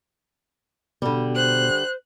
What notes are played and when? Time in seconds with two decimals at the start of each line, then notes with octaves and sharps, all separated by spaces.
1.02 B2 D3 G3
1.35 C5 F#6